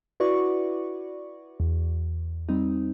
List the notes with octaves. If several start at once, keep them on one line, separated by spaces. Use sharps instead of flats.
E4 F#4 B4 D5 C#6
E2
G3 C4 D#4